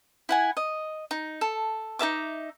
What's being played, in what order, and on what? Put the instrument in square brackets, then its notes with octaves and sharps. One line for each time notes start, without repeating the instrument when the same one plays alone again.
[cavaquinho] E4 F#5 G#5
D#5
D#4
A4
D#4 A#4 E5 D6